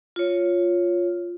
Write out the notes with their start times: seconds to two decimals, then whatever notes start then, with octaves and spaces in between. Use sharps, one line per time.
0.16 F4 C#5